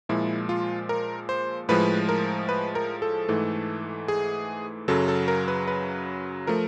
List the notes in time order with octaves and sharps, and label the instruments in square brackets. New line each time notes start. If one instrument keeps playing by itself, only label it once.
[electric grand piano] A#2 F3 G#3 E4
F4
A#4
C5
A2 F3 G#3 B4
A#4
B4
A#4
A4
G#2 E3 A3
G#4
F#2 C#3 F#3 A4
A4
A#4
B4
B4
F3 A3 A#4